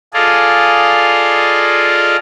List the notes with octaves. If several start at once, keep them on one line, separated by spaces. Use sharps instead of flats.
F4 G#4 A4 D5 D#5 F5